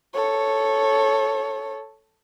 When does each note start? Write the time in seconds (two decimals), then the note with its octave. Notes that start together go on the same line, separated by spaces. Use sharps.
0.14 A4 C#5